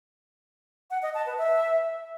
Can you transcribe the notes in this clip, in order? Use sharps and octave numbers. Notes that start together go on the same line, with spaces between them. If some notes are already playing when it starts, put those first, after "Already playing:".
F#5
D#5
A5
B4
E5